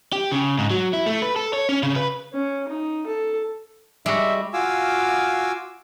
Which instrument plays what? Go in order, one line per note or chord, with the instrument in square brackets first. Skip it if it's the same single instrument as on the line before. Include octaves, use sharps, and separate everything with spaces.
[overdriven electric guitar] G4
C#3
G#2
F#3
E4
A3
B4
A4
C#5
C#4
C#3
B4
[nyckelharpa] C#4
D#4
A4
[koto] G3 F#4 [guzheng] G#3 [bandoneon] E5
[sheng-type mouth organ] F4 F#4 F5 G#5 D6 E6